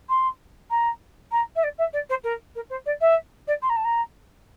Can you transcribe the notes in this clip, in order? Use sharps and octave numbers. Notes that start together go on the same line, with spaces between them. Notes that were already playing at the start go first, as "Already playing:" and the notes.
C6
A#5
A#5
E5
D5
E5
D5
C5
A#4
A#4
C5
D5
E5
D5
C6
A#5
A5
A#5